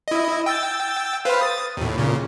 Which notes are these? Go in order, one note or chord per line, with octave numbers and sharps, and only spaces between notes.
E4 D#5
G5 E6 A6
B4 C5 F5
D#6 A6
D#2 A2
A#2 C#3